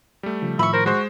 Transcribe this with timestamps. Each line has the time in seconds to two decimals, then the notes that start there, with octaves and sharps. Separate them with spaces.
0.23 G3 A3
0.42 C#3 F3
0.59 A2 D#3 F3 E5 B5 C#6
0.74 A#4 C5
0.86 G#3 F#4 C5